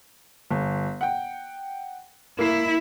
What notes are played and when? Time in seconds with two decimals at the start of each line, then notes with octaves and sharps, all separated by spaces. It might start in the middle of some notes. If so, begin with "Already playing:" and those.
0.51 G1
1.01 F#5 G5
2.39 A#3 E4 E5 C7